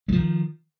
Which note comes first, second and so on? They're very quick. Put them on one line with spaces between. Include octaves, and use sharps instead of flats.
G#3 F3 D#3